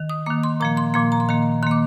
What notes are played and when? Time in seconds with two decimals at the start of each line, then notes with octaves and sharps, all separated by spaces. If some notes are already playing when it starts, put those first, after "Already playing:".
Already playing: D#3
0.09 D#6
0.26 D#3 A#3 D6
0.43 C6
0.60 A#2 F3 A#3 A#5
0.77 C6
0.94 A#2 F3 A#3 C6
1.12 A#5
1.20 C6
1.29 D#3 A#3 A#5
1.63 D#3 C6
1.67 A#3 D6